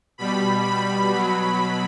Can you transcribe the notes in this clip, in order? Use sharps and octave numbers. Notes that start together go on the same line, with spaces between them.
B2 G3 B5
B5
B2 F#3